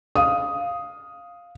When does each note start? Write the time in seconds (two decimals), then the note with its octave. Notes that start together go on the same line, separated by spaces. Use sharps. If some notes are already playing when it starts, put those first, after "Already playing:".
0.16 F5 D#6